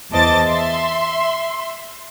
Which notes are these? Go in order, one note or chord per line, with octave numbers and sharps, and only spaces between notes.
E2 C5 D#5 A5 D6 A6
E5 C6